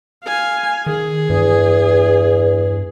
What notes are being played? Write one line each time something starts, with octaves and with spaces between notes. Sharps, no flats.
F5 G#5
D#3 G#4
E2 G2